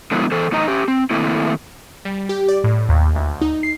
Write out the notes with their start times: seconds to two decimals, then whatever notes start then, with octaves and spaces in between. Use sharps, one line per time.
0.12 D3 F3 F#3 G#3 B3 E4
0.32 E3 A4 C5
0.52 E2 A2 E3 D#4 D#5 A#5
0.68 C#4 G4
0.88 C4
1.10 D#3 A3 A#3 C4 E4
2.05 G3
2.29 G4
2.48 D5
2.64 A2
2.89 D#2
3.15 D2
3.41 D#4
3.63 C7